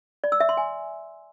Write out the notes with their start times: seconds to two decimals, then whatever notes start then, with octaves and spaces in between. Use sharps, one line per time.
0.24 D5
0.32 E6
0.40 E5
0.49 C6
0.57 G#5